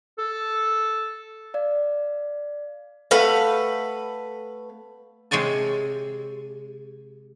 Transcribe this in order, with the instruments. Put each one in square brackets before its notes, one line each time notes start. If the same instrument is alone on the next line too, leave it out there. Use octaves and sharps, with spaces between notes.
[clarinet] A4
[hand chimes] D5 F5
[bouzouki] A3 B4 F5 F#5
[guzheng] C3 G#3 C#5 G#5 A5